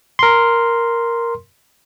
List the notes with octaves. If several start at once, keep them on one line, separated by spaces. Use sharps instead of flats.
A#4 C6